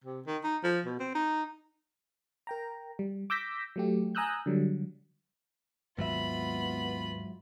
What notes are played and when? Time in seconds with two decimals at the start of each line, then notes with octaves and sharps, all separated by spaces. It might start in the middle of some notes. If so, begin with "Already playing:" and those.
0.04 C3
0.27 D#3
0.44 D#4
0.64 F3
0.86 B2
1.00 C4
1.15 D#4
2.47 A#4 G5 A#5
2.99 G3
3.30 D6 E6 G6 A#6 B6
3.76 F#3 A3 G4
4.15 G#5 A#5 D#6 E6 F#6 G6
4.46 D3 F#3 G3
5.99 G#1 D#2 G#2 F#3 B3 F4 E5 B5